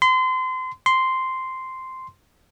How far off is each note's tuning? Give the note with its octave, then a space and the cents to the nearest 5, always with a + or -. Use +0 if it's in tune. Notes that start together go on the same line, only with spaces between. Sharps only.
C6 -30
C6 -5